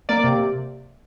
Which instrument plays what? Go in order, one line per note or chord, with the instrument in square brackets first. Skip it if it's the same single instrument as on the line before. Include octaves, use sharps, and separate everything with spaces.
[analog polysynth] A#3 D5
C3
C3